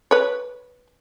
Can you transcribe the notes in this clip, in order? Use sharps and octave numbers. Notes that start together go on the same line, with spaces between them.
B4 C#5